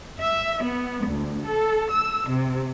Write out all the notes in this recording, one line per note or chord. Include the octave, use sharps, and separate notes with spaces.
E5
B3
D2
A4
E6
C3